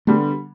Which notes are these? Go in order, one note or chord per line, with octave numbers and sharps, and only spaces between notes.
D3 G3 A3 B3